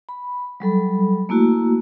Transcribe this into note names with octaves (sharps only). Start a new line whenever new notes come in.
B5
F#3 G3 A4 B5
A3 A#3 E4 F#4